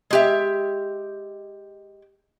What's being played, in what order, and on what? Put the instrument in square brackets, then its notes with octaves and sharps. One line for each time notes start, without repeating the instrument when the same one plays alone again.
[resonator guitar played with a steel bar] G#3 G4 E5